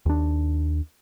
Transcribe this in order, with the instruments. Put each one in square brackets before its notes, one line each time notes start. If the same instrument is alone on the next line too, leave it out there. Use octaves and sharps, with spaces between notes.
[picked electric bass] D#2 D4